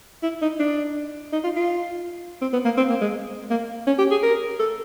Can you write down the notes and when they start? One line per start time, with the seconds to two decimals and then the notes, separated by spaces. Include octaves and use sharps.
0.23 E4
0.42 D#4
0.59 D4
1.33 D#4
1.44 F4
1.56 F4
2.41 C4
2.53 B3
2.65 A#3
2.77 C4
2.89 A#3
3.01 G#3
3.50 A#3
3.87 C#4
3.98 G4
4.11 G#4
4.23 A#4
4.59 A4